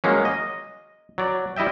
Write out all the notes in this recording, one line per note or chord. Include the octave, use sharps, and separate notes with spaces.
F#3 G#3 A#3 C#4
D#5
F#3 D5
G3 E4 D#5 E5 G5